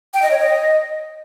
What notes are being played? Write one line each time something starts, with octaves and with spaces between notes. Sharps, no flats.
G5
D#5
C#5
D#5